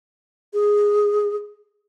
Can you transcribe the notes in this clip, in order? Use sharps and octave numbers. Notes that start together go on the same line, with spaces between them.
G#4